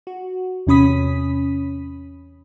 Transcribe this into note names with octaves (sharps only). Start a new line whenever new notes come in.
F#4
E2 C3 C#4 B5 D#6 B6